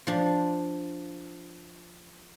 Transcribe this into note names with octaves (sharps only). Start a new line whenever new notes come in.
F3 D4